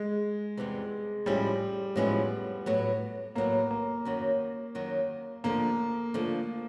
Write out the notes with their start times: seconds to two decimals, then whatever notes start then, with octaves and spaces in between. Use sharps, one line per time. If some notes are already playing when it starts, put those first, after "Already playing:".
Already playing: G#3
0.57 E2 C3 E3 G3
1.26 A2 F3 G3 G#3 C#4 E4
1.96 A2 F3 G#3 B3 C#4 E4
2.66 A2 F#3 B3
3.35 A2 F#3 A#3 B3
3.71 A#3
4.05 F#2 D#3 F#3
4.75 F#2 D#3 F#3
5.44 D3 F3 A3 A#3
6.14 D3 F3 A3